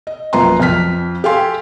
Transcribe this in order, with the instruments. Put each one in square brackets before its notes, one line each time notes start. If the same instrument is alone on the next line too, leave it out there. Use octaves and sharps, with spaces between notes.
[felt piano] D#5
A#1 F#2 F4 B4 A#5 C6
F2 F3 F6 B6
G4 A4 F5 G#5 C6